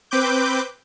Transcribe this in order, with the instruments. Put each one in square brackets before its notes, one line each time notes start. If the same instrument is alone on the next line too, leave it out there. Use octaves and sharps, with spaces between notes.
[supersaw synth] C4 B4 D6 G6